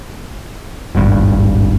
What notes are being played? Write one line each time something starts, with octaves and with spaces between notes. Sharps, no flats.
D#1 G#1 G2